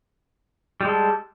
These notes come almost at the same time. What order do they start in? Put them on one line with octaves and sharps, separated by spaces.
G3 G#3 A4